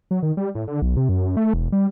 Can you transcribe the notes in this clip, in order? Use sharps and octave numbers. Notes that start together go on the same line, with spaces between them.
F#3
D#3
G3
A2
D3
B1
C3
F#2
A3
E1
G3